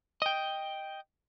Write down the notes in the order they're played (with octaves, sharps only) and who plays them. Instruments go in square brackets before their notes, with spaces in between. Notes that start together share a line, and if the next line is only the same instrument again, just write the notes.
[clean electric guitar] D#5 G5